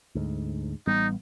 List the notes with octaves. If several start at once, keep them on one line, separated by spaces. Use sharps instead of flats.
D2 G#2
A1 G3 B3 D#4